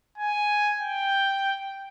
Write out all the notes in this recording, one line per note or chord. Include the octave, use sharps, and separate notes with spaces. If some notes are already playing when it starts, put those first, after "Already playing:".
G#5
G5